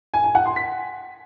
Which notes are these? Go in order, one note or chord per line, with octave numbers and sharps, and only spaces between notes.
G#5
G#5
F#5
C6
B6